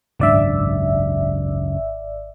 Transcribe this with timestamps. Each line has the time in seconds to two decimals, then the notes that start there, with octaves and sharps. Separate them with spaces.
0.19 G#1 C#2 F#2 D4 D5 E5